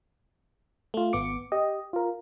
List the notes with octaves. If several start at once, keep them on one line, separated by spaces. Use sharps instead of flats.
A3 F4
G#1 B3 D6 C#7
G4 D#5
F4 A#4